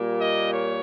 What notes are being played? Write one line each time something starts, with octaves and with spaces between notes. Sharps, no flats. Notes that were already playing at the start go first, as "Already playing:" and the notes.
Already playing: A#2 G3 A#3
D#5
C#5